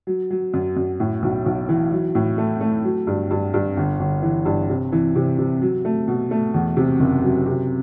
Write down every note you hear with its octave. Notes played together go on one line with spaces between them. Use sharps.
F#3
F#3
F#2
F#2
A2
B1
B1
E3
F#3
A2
A3
A3
F#3
G2
G2
G2
G1
G1
E3
G2
C3
E3
C3
C3
F#3
A3
B2
A3
E2
C3
F#1
F#3
C3